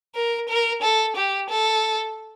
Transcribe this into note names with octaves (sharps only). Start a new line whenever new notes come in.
A#4
A#4
A4
G4
A4